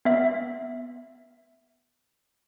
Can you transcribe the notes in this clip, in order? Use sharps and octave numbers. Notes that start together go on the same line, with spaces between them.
B3 E5